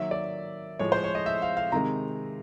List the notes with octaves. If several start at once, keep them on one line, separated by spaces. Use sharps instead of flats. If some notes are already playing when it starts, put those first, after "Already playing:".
Already playing: D#3 F#3 A#3 E5
D5
A2 F3 G#3 C#5
C5
C#5
D#5
E5
F5
F5
C3 D#3 G#3 A#5